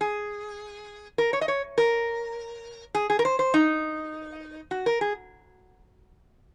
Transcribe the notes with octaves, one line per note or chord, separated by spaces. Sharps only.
G#4
A#4
C#5
D#5
C#5
A#4
G#4
G#4
A#4
C5
C5
D#4
F#4
A#4
G#4